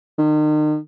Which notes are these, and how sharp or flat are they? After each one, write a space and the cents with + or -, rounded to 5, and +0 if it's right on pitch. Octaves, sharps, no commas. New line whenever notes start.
D#3 -40